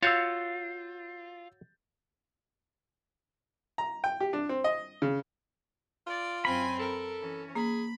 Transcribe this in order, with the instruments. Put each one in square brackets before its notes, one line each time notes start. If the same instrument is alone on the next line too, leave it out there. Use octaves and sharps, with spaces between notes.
[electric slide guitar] F4 [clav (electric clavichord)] F#4 C#5 F5 [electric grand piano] E6 G6 A6
[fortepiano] A#5
G5
G4
D4
C4
D#5
C#3
[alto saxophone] F4 [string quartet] D5
[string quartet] F#2 C4 G#5 [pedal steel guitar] B5
[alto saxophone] A4 [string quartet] A#4
[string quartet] E3 C#4
[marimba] A#3 [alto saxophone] G#4 [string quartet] B5